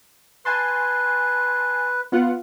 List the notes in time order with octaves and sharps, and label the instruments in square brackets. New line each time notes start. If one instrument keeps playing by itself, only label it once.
[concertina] B4 [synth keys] G#5 A5 C6
[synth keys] B3 F4 F#5